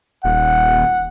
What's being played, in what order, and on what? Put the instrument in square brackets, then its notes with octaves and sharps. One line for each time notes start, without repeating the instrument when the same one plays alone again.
[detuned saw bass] D#1 [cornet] F#5